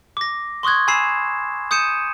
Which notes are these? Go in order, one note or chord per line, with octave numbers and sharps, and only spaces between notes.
D6 A#6
C6 C#6 D#6 F#6 G#6
G#5 B5 E6 C7 E7
D#6 G6 C#7 D#7 E7